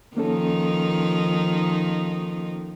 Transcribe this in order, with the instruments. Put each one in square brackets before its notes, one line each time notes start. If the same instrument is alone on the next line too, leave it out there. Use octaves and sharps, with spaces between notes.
[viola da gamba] D#3 F3 D#4 [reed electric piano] A#3 C#4 A4